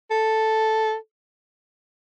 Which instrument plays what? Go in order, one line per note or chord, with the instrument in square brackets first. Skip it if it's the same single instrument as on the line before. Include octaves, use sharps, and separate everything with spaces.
[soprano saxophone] A4